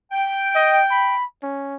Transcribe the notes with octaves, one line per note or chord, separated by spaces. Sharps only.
G5
D#5
B5
C#4